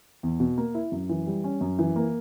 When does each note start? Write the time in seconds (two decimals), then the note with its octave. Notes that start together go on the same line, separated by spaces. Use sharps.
0.23 E2
0.40 B2
0.58 A#3
0.75 E4
0.92 F#2
1.09 E3
1.27 G3
1.44 C#4
1.61 F#2
1.79 E3
1.96 A#3